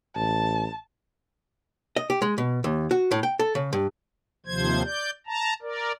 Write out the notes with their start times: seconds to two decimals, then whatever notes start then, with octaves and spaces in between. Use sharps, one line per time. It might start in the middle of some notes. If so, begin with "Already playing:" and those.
0.16 A1 A5
1.96 D#5
2.10 G4
2.22 G#3
2.38 B2
2.64 D#2
2.91 F#4
3.11 A2
3.23 G5
3.39 A4
3.55 C#3
3.73 G2
4.46 D#2 C3 F3 C5 G#6
4.85 D5 G6
5.27 A5 A#5
5.62 A#4 D5